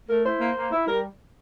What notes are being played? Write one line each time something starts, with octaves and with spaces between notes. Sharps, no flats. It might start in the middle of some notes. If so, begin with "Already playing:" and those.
A3 A#4
E4 C5
A#3
A#3
E4
G3 A#4